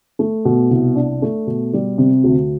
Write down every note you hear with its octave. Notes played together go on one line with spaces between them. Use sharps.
A3
B2
C2
D4
A3
B2
G3
C3
D2